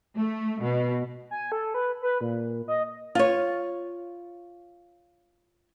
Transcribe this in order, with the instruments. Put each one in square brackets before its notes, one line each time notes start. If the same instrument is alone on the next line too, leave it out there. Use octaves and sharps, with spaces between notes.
[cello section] A3
B2
[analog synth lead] G#5
A4
B4
B4
A#2
D#5
[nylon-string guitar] F4 C#5